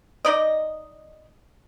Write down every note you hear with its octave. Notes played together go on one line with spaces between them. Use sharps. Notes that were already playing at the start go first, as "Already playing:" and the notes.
D#4 D5 D#5